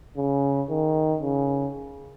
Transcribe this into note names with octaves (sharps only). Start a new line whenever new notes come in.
C#3
D#3
C#3